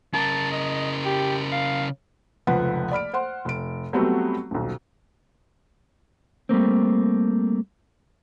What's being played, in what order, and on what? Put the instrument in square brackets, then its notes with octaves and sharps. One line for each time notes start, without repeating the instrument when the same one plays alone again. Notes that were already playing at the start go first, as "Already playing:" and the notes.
[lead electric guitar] C#3 A#4 [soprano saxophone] A5
[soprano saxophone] D#5
G4
F5
[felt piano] F1 C#2 F3 B4 F#5
D5 B5 F6 D7
C5 F#5 C6
F1 D7
F#3 G3 A3 B3 C4 F#4
D#1 B1
[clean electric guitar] G3 A3 A#3 C4